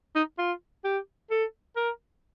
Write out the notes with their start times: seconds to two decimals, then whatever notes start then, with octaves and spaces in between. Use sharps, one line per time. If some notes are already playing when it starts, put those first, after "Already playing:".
0.15 D#4
0.38 F4
0.84 G4
1.30 A4
1.76 A#4